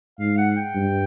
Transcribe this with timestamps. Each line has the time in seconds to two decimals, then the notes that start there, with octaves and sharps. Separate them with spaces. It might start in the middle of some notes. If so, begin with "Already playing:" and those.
0.20 G#2 F5
0.38 F#5
0.56 G5
0.75 G2